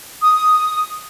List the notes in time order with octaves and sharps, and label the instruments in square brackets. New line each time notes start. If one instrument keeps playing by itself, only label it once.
[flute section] D#6